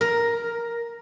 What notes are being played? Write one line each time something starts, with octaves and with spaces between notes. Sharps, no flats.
A#4